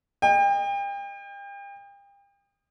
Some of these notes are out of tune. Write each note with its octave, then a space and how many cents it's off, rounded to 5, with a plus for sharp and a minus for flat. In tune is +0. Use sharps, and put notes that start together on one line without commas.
D#5 -20 G5 +35